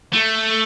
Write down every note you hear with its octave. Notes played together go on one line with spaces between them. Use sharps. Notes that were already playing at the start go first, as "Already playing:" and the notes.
A3